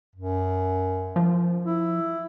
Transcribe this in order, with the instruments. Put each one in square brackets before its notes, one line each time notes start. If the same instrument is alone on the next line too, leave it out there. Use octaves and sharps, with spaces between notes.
[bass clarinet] F#2
[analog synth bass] F3
[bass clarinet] E4